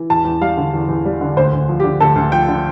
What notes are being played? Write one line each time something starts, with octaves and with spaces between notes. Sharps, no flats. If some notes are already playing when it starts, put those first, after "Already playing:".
Already playing: E3
E2 A5
E2
G3 F5
D3
E2
E2
G3
D3
D2 C5
D2
F3
G4
D3
D2 A4
D2
F3 G5
D3